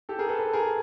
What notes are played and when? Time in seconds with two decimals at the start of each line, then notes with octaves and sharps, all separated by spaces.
0.09 G4 A4
0.19 G#4 A#4
0.29 A4 B4
0.39 A4 B4
0.53 G#4 A#4